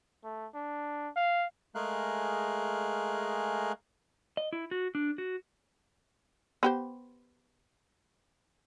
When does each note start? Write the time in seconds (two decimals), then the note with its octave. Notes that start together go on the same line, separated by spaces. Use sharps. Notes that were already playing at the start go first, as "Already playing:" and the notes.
0.24 A3
0.55 D4
1.16 F5
1.75 G#3 A3 G#4 A#4 F5 F#6
4.37 D#5
4.53 E4
4.71 F#4
4.95 D4
5.18 F#4
6.63 B3 G4 C5